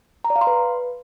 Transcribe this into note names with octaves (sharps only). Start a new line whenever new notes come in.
A#5
D5
F5
C6
B4